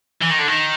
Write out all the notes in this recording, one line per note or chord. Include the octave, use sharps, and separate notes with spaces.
E3
D#3
D3
D#3